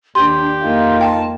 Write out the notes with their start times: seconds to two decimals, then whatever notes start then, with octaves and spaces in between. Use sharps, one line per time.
0.15 D#2 D4 G4 C6
0.62 F2 A#3 D#4 F4
1.01 G5 A5